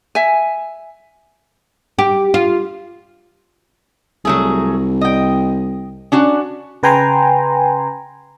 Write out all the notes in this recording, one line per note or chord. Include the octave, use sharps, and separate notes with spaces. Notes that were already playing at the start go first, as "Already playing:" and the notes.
E5 G#5
G4
F4
C2 F#3 A3 G#4
D#5 G5
C#4 D4 F#4
C#3 B4 G5 G#5 A#5 C6